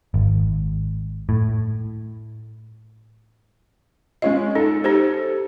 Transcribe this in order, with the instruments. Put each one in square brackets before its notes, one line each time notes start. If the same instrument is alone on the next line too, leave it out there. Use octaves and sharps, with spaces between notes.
[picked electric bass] G#1
A2
[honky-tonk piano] G#3 C#4 F4 [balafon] D#5
[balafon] D#4 [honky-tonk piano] A4
[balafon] D#4 G4 C5